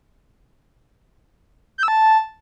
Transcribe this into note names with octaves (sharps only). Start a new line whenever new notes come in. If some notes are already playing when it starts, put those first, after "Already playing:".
G6
E6
A5